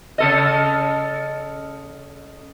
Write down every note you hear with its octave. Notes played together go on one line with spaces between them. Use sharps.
C#3 A4 D#5